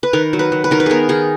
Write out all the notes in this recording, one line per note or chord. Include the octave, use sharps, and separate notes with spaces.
B4
D#3 A#4
F#3
B4
F#3
B4
D#3 A#4
B4
B3 G#4 A#4
D#3 G#4